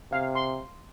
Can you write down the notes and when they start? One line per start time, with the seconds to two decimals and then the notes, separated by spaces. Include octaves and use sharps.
0.12 C3 F5
0.35 C6